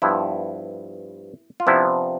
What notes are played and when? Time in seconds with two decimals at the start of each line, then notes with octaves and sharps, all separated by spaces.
0.02 G2 F3 B3 E4
1.60 F4
1.67 C3 F3 B3 D4 E4